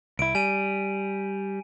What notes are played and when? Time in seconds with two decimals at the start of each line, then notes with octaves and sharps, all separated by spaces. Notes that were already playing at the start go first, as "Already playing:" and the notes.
0.19 C2 E4 D7
0.35 G3 G#5 D#7